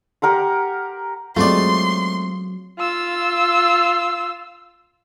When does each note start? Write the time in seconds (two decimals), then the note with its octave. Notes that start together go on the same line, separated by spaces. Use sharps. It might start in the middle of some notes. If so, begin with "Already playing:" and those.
0.22 G4 A#4 F#5 C6
1.37 F#3 G#3 A3 C4 F4 D5 C6
2.79 F4 E6